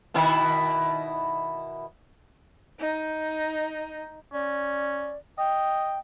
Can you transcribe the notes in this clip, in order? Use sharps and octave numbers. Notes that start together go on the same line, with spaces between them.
B2 D#3 E4
D#4
C#4 D5
D#5 G5